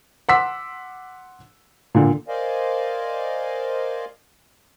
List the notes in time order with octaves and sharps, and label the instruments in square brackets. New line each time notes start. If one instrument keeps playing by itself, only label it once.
[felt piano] F#5 C6 D6 E6 B6
A#2 D3
[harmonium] A#4 C5 D5 D#5 F5 G#5